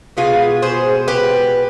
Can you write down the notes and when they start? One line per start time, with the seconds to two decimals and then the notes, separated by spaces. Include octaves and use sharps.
0.17 B2 G#3 B3 F4 G#4
0.62 G#4 C5
1.08 G4 B4